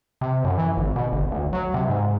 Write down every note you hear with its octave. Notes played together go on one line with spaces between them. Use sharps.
C3
F#2
E3
G#1
B2
G1
D2
F#3
C3
G#2